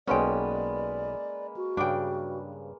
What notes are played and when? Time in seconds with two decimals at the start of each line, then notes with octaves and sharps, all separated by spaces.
0.07 B1 G#3 A#3 B3 C#4 B4 D5 G5
1.57 F#4
1.77 G2 C#3 D4 G5